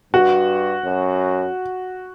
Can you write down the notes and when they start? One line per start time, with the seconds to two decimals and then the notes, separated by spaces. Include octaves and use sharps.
0.13 G2 F#4
0.85 F#2